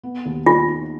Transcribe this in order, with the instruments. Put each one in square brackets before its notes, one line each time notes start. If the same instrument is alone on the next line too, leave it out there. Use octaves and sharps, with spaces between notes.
[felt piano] B3
D#2
[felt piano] D#2 [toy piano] F4
[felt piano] D#4